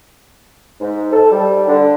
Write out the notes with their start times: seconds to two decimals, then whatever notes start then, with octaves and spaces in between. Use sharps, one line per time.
0.81 G#2
1.13 A4
1.32 G3
1.68 D3